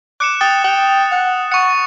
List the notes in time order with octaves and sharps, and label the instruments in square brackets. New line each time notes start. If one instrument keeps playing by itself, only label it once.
[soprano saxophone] D6 [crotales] F#6 C#7 E7
[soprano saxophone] G5 [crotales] D#6 A6
[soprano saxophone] G5
F#5
[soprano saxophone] F#5 [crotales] C#6 C#7